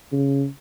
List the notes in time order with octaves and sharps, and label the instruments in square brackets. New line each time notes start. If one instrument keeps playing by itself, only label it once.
[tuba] C#3